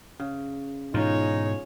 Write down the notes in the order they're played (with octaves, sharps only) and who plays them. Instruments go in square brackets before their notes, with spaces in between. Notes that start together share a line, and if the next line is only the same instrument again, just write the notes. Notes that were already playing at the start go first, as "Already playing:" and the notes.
[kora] C#3
[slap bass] G#2 B2 E3 [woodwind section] D#4 [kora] F4 [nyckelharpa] G#4 C#5